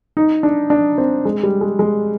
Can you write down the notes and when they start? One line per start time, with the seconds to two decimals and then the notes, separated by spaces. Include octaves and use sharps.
0.17 D#4
0.43 D4
0.70 D4
0.98 C4
1.25 G#3
1.43 G3
1.61 G#3
1.79 G#3